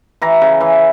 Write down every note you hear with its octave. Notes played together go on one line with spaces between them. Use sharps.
E3 A#5
C#3
E3